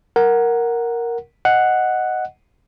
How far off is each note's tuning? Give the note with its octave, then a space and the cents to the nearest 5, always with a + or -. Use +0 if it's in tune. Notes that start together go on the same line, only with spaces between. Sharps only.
A#4 +0 F#5 +0
D#5 +0 F#5 +0